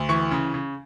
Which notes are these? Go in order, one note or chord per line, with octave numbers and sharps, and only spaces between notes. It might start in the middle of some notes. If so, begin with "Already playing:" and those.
Already playing: D2
E3 C#6
C#3
C#3